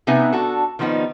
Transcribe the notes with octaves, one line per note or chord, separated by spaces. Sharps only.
C3 B3 D#4 B4 E5 G#5
D4 F#4 A4
D#3 F3 G3 B3 D#4